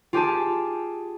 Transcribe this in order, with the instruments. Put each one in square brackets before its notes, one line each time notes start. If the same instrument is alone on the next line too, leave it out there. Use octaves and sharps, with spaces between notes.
[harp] F4 G4 G#4 A5